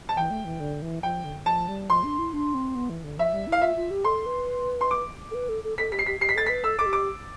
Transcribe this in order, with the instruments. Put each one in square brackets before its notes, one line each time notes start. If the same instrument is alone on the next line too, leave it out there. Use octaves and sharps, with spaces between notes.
[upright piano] A5
[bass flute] E3 [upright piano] G5
[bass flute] A3
E3
D3
E3
[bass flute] F3 [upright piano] G5
[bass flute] D3
[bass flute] F3 [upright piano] A5
[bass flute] G3
[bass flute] F3 [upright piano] C6
[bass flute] D4
E4
D4
C4
B3
E3
D3
[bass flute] F3 [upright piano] E5
[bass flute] G3
E4
[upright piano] F5
[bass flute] F4 [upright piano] E5
[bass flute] F4
G4
[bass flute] A4 [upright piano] C6
[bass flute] B4
[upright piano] C6
D6
[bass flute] A4
B4
A4
A4
[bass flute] A4 [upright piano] B6
[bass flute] G4 [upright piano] B6
[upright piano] C7
[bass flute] G4 [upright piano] B6
[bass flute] G4 [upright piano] C7
[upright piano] B6
[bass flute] A4 [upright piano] A6
[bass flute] B4 [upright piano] B6
[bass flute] A4 [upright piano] E6
[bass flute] A4 [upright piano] D6
[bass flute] G4
[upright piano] D6